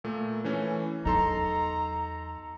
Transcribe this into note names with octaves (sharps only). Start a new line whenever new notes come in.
A#2 A3
E3 A3 C#4
E2 F#3 D#4 A4 A#5 C6